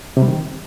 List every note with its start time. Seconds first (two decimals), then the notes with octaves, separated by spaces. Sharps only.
0.17 C3
0.22 G3
0.28 D#3